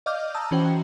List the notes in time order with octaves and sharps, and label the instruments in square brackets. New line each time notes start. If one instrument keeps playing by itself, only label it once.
[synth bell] D5 D#5 F5 D6 F6 G6
A5 A#5 D#6 E6
E3 C#4 F#4 C5 G5